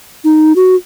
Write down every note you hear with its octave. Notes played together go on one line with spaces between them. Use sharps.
D#4
F#4